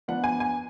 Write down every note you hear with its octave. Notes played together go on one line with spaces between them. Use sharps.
F3 B3 D4 F#5
G#5
G#5